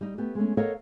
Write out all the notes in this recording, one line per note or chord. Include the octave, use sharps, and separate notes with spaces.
G3 D#4
A3 B3 G4
G#3 A3 C#4
A4 A#4 C#5 D#5 F5 F#5